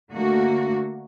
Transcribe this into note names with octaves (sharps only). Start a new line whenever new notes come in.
D3 A3 A#3 F#4